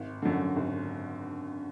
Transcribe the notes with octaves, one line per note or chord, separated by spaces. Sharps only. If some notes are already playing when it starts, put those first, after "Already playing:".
Already playing: G#1
F#2 D3
G#1